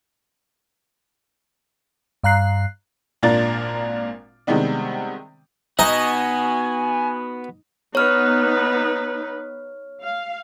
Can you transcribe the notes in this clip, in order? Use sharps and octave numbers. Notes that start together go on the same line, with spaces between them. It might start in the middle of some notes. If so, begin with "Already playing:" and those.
G2 F5 A#5 F#6 C7
G#1 A#2 D4 F4 A#4 A6
C3 D#3 G3 G#3 B3 D4
B3 D#4 F#4 D#5 G#5
B3 D#4 B4 C#5 F6
F5